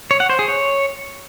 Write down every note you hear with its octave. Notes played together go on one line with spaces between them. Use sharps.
C#5
F#5
C5
G#4
C#5